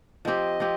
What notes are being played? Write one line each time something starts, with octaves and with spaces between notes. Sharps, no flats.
F3 C4 G4 D#5
F3 C4 G4